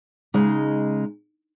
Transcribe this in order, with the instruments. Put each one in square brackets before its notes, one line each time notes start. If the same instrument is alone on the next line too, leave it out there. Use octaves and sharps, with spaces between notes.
[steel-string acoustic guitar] C#3 G#3 D#4